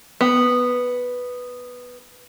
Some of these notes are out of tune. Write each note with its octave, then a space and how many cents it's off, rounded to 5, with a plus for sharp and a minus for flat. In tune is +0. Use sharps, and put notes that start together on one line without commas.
B3 +0